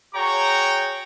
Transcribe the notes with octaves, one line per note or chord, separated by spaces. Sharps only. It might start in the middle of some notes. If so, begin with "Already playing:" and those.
F#4 G#4 C#5 G5 A#5 C#6